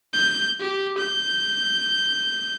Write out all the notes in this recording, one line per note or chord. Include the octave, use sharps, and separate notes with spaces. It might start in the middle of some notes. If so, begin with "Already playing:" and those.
G6
G4
G6